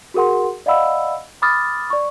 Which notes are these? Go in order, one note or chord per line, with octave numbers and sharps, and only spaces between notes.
F#4 G#4 A#4 F#5 C6
D5 D#5 F5 F#5 B5 E6
B5 D6 D#6 F6 A6
D5 C#6